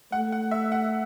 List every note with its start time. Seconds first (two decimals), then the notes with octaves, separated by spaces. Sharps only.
0.12 A3 F#5
0.32 F#5
0.51 E5
0.72 F#5